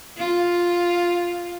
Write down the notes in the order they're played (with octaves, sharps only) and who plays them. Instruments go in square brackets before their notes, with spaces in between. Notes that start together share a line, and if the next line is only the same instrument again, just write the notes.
[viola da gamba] F4